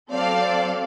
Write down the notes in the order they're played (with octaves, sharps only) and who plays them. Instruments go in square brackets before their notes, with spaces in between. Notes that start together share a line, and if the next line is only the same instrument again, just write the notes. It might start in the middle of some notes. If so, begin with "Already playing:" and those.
[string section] F#3 C4 A4 D5 F5